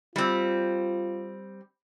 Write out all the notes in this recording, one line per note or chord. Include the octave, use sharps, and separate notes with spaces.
G3 C4 F4